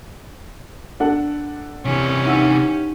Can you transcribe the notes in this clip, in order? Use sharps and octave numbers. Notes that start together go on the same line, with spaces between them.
D4 A4 F#5
C3 E3 C#4 G4
D#4 E4 F#5 E6